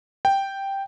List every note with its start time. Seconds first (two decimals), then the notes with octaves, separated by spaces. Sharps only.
0.25 G5